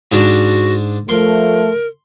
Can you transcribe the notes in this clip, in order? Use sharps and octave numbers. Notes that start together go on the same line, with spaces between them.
G#2 D4 F#4 A5
F3 A3 A#4 C6